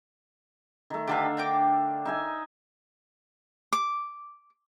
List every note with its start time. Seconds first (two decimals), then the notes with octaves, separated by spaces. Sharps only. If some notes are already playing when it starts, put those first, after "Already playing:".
0.90 D#3 A3
1.07 D3 D4 G4 A4 B4 F5
1.37 A#4 G5 D6
2.05 D#4 E5 G#5
3.73 D6